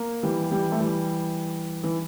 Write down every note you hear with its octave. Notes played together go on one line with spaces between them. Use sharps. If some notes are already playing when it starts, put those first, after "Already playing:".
Already playing: A#3
E3 G3
E3 G3
A3
E3 G3
E3